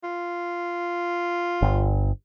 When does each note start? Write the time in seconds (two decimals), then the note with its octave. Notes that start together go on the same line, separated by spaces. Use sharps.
0.03 F4
1.62 G1